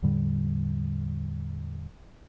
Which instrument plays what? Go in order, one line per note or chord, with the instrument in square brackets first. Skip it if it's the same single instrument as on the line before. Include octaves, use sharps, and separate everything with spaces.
[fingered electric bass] E2 A2 D3 G3